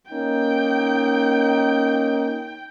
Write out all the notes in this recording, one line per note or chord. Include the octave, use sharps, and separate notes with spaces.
A#3 C#4 D#4 G5